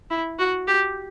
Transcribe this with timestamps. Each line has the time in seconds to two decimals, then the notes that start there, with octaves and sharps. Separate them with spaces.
0.10 E4
0.39 F#4
0.67 G4